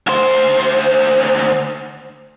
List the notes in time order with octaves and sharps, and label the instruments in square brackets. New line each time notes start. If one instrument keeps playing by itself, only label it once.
[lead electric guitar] D2 C5